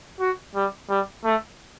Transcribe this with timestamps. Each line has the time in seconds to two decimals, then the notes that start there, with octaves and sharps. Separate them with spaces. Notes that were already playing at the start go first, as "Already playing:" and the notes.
0.21 F#4
0.55 G3
0.90 G3
1.25 A3